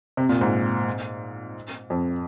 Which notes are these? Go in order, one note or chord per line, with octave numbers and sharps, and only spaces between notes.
C3
A#2
G#2
F2